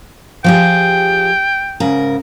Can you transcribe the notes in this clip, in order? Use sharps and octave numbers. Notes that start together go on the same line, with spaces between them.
F3 G4 G#4 G5
G#2 C#3 A#4